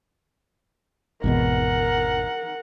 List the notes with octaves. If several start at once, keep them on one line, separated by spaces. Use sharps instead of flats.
G#1 E2 B2 A#4 F#5